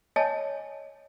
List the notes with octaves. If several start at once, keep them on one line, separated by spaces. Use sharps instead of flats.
C#5 D#5 G#5 A5